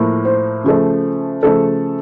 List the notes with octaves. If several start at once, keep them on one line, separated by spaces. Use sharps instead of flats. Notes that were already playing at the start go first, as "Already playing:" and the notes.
Already playing: A2 F3 A#3
C5
C#3 F3 A3
C#3 F3 A3 A4